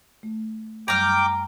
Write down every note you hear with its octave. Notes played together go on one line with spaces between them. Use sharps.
A3
F#2 F#3 G3 G5 A#5 D6 F6